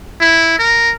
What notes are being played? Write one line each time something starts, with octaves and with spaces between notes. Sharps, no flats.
E4
A#4